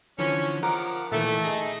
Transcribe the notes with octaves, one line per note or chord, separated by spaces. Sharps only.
D3 E3 F3 C#4
D#3 F3 A#4 F#5 D6
A#2 D#3 E3 A3
D#4 G#4 A#6